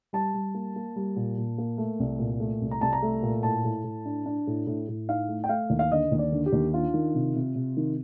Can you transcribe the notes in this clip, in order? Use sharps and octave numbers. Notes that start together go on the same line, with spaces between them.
G3 A5
G3
A#3
A#3
G3
A#2
A#2
A#3
A3
C2
A#2
A3
C2
A#5
C2 A5
A#5
A3
A#2
A2 A5
A2
A2
D4
D4
A2
A2
A2
D#4 F5
A3
G5
A3 F5
D#2
F5
D3 D#5
D#2
D5
D3
G4
D#2
D4 F4
D#3
C3
C3
C3
D#3